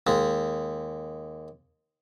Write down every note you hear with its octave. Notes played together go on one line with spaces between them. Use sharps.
D#2 G#3